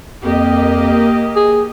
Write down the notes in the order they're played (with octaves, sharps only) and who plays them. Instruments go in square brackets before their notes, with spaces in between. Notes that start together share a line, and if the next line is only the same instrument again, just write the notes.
[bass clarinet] F2 [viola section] A#3 G4 D#5
[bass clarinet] G#4